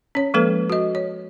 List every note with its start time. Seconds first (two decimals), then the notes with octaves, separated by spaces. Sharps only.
0.15 C#4 C#5
0.34 F3 G#3 A#3 A4 B4
0.70 F#4 D#5
0.95 C#5